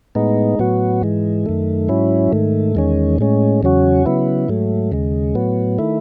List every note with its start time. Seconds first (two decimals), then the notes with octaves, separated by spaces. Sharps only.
0.15 A2 G#3 B3 D#4
0.59 A2 F#3 B3 F#4
1.02 G#2 E3 G#3
1.46 F#2 D#3 A3
1.88 G#2 F#3 C#4 E4
2.32 G#2 D#3 A3
2.75 E2 D#3 G#3 C#4
3.18 A2 G#3 C#4
3.63 E2 C#3 F#3 C#4 F#4
4.06 C#3 F#3 B3 E4
4.48 G#2 F#3 A3
4.92 D#2 C#3 G#3
5.35 A2 F#3 B3
5.79 D#3 A3 E4